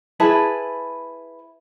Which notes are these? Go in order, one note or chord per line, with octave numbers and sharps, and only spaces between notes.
E4 G#4 B4 A5